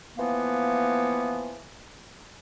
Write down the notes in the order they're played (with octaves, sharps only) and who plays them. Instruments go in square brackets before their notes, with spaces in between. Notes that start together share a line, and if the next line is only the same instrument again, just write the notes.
[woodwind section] E3 F3 A#3 B3